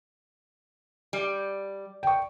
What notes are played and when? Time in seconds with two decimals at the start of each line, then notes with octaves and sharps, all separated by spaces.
1.13 G3
2.03 G5 C#6